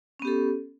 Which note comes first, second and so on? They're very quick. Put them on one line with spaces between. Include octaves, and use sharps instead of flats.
C#4 B3 G4 A4